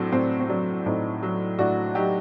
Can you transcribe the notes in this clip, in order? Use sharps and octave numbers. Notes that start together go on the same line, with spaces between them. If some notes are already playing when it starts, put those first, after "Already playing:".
Already playing: A2 F#3 C4 D4 F#4
A2 C4
C4
F#3 D4
A2 C4 D#4
F#3
A2 D4 F#4
F#3 D#4 G4